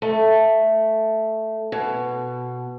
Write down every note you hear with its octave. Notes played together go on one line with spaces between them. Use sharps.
A3
B2